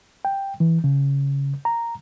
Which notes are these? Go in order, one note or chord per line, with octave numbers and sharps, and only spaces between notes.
G5
E3
C#3
A#5